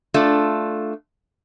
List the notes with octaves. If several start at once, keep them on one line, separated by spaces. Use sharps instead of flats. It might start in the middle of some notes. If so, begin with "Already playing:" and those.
A3 D4 F4